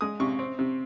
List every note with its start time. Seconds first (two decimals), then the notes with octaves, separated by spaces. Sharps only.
0.01 G#3 D#6
0.20 C3 C#6
0.39 C4
0.59 C3